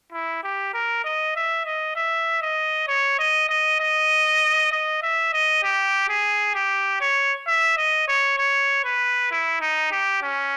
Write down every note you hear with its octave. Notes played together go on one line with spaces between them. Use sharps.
E4
G4
A#4
D#5
E5
D#5
E5
D#5
C#5
D#5
D#5
D#5
D#5
E5
D#5
G4
G#4
G4
C#5
E5
D#5
C#5
C#5
B4
E4
D#4
G4
C#4